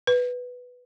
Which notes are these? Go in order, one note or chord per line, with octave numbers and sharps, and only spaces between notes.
B4